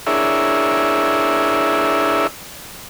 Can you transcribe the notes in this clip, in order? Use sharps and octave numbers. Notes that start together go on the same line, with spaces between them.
D4 E4 G#4 A#4 C#5 E5